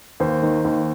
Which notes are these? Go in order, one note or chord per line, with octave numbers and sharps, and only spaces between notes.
D#2 C5
D#3
D#2